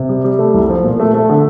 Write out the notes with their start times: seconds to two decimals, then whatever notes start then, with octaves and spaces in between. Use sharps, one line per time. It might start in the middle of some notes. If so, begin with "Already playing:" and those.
Already playing: C3
0.09 G3
0.24 G3
0.39 A3
0.54 C2
0.69 F3
0.84 A#2
1.00 A3
1.14 A3
1.29 D3